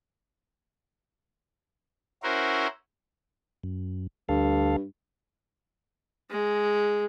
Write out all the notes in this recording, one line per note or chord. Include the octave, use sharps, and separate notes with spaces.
C#4 E4 F#4 A#4 C5
F#2
D2 G2 A4 F5
G#3